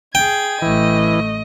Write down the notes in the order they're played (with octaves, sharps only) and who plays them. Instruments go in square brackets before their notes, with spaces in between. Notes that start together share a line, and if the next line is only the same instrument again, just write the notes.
[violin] G#4 G#6 [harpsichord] G5
[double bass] A1 A3 [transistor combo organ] E3 [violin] D#5